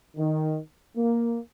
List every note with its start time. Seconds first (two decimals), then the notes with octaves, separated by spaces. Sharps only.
0.17 D#3
0.96 A#3